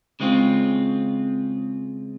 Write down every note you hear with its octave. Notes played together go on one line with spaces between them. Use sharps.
C#3 G#3 C4 F4